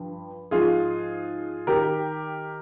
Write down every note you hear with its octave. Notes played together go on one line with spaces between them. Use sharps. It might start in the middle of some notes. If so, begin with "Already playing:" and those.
Already playing: G2 F3
G#2 F3 F4 G#4
D#3 G4 A#4